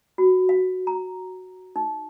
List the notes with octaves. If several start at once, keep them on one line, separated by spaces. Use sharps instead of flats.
F#4
F5
A#5
D#4